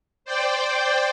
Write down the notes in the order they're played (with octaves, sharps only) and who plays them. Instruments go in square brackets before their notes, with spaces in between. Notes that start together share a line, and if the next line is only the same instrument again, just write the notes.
[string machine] C5 D5 G5